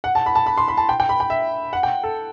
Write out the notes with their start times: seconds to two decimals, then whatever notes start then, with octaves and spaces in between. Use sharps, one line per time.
0.04 F#5
0.15 A5
0.26 B5
0.35 A5
0.46 B5
0.57 C6
0.68 B5
0.77 A5
0.89 G5
1.00 G5
1.09 B5
1.20 G5
1.30 E5
1.73 F#5
1.83 G5
2.04 A4